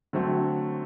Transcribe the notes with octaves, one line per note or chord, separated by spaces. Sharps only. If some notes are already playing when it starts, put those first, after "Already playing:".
D3 F#3 A3 C4